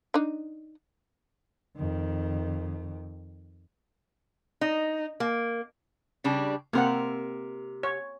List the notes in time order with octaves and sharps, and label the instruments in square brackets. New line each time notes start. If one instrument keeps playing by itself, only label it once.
[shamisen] D4 D#4
[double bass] F2 D#3
[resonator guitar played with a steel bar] D#4
A#3
C#3 G3 D4
[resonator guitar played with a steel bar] C3 A#4 [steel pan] A#3 C4 F#5
[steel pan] C#5